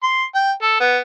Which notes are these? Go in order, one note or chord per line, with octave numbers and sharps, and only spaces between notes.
C6
G5
A4
B3